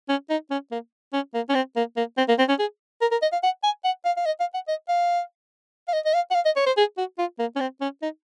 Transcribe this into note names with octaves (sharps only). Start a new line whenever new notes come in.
C#4
D#4
C#4
A#3
C#4
A#3
C#4
C4
A#3
A#3
C4
A#3
C4
C#4
G#4
A#4
A#4
D#5
F5
F#5
G#5
F#5
F5
F5
D#5
F5
F#5
D#5
F5
F5
D#5
D#5
F5
F#5
F5
D#5
C#5
C5
G#4
F#4
F4
A#3
C#4
C4
C#4
D#4